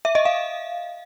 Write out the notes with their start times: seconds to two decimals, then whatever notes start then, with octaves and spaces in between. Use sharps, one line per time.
0.05 E5
0.15 D#5
0.25 F5